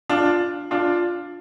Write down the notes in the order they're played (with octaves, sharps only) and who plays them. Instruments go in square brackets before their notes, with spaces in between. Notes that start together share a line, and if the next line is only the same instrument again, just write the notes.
[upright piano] D4 F4
D4 F4